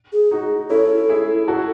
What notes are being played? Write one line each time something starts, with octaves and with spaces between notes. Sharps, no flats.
G#4
D#4 F#4
C#4 E4 A4
E4 G#4
F#4 A4